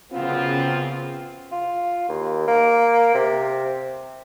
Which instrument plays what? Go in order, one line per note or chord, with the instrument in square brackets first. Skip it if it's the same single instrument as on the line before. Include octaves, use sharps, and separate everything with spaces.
[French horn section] F#2 F4 [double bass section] C#3 [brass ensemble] B3 C4
[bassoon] F4
D#2
A#3
C3